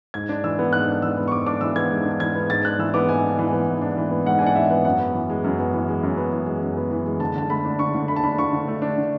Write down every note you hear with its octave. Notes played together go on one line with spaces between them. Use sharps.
G#2 G#6
D4
E3 E6
B3
G#2 F#6
D4
E3 E6
B3
C#6
G#2 D6
D4 D6
E3 E6
B3 G#6
G#2
D4
E3 G#6
B3
G#2 A6
D4 F#6
E3 E6
B3 D6
G#2 G#5
D4
E3
B3
G#2
D4
E3
B3
G#2 F#5
D4 G#5
F#5
E3 E5
B3
F#2 F#5
B3
E3
G#3
F#2
B3
E3
G#3
F#2
B3
E3
G#3
F#2
B3
E3
G#3
D3 A5
D3 A5
A3 B5
D4
D3 C#6
D3
A3 B5
A5
D4 B5
D3 C#6
D3
A3
D4
D3